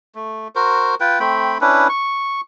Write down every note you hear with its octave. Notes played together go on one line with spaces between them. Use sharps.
A3
F#4 A#4 C5
F4 B4 G5
A3 C4 G5 B5
C#4 D4 E4 B4
C#6